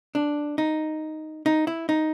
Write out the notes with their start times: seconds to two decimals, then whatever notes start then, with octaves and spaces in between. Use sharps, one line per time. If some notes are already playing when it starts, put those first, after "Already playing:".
0.15 D4
0.58 D#4
1.46 D#4
1.67 E4
1.89 D#4